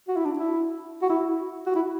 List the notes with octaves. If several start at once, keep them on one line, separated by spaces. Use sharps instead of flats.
F#4
E4
D4
E4
F#4
E4
F#4
E4